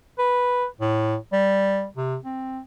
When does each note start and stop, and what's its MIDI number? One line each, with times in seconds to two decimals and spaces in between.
0.19 0.66 71
0.81 1.16 45
1.33 1.86 55
1.97 2.17 48
2.24 2.61 60